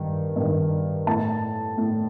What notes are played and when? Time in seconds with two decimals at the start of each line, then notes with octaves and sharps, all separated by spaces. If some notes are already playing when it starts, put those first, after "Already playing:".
Already playing: G2 D#3
0.36 G2 D#3
1.07 A2 A5
1.77 A2